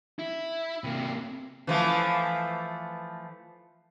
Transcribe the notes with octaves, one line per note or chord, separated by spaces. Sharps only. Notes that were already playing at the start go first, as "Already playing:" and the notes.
E4
C3 A#3
E3 F3 A3